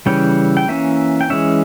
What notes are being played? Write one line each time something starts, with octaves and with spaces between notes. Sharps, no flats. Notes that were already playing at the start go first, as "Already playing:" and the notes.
C#3 E3 G3 C#4 G5
G5
E3 A#3 C#4 E5
G5
E3 G#3 C#4 E5